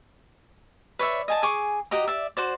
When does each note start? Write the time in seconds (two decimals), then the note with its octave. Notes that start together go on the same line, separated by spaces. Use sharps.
0.99 B4 C#5 D5 E5
1.28 D#5 G#5 A5
1.43 G#4 G#5 C#6 D6
1.91 F#4 G4 D#5 A#5
2.08 D5 E5
2.37 F#4 C5 D5